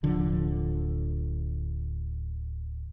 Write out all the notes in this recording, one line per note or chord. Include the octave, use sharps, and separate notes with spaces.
D1 D3 F3